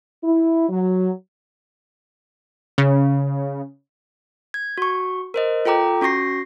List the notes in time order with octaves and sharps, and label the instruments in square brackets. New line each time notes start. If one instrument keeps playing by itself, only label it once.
[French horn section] E4
F#3
[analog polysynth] C#3
[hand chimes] G#6
F#4 C#6
A#4 C5 D#5
F4 A4 G5 A#5 D6
C#4 F#4 C#6 A#6 C7